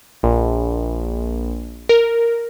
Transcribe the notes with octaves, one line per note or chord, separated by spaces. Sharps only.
A#1
A#4